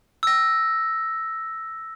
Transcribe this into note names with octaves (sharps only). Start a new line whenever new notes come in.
E6 A#6